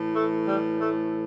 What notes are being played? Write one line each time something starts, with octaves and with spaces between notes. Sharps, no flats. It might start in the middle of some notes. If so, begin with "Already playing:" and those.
Already playing: A2 E3
A3
G3
A3